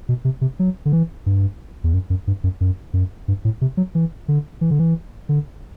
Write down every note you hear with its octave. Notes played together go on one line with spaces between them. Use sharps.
B2
C3
C3
F#3
D3
E3
G2
E2
F#2
F#2
G2
F#2
F#2
F#2
G2
A2
C3
F#3
E3
D3
E3
D3
E3
D3